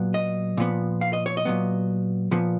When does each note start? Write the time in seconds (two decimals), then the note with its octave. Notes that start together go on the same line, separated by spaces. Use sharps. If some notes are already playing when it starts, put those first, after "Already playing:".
Already playing: A#2 F#3 B3
0.14 D#5
0.57 A#2 F3 B3
1.01 F5
1.13 D#5
1.26 C#5
1.37 D#5
1.45 A#2 F#3 B3
2.31 A#2 F3 B3